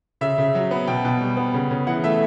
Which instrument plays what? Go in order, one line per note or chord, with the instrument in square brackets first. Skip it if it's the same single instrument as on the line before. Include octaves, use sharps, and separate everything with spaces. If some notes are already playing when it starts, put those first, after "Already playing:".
[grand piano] C#3 E5
C#3
F#3
B3
B2 G5
B2
G3
B3
C#3
C#3
E3 F#5
A3 E5